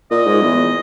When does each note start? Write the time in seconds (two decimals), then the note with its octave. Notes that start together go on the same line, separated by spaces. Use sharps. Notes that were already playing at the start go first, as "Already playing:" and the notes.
0.11 A#2 D#5
0.27 G#2
0.43 E2